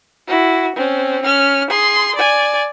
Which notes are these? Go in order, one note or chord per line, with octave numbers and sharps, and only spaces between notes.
E4 F#4
C4 C#4
C#4 F6
G#4 C6
D5 G#5